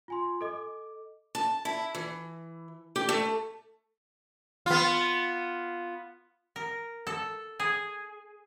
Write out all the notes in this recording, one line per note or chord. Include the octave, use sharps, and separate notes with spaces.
F4 G#5 C6
A4 D#5 D6
A5
E4
E3
G4
A3
B3 F4
A#4
A4
G#4